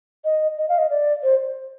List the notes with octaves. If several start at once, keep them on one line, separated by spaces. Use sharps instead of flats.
D#5
D#5
F5
D#5
D5
C5